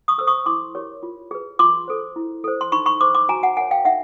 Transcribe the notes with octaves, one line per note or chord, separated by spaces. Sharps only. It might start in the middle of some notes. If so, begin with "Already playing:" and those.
C#6 D#6
A4 C5 E6
C#6 D#6
E4 C6 D6
G4 A#4 C#5
F4
G#4 B4
F4 C6 D6
A4 C5
E4
A4 C5
C6
D#4 B5 C#6
B5 C#6
G#4 C5 C6 D6
C6 D6
F#4 G#5 A#5
F#5 G#5
A#4 C#5 F#5 G#5
F5 G5
D#4 E5 F#5